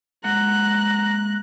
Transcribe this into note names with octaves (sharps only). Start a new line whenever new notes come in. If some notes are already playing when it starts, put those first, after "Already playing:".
G#3 A#3 F#5 A#5 F#6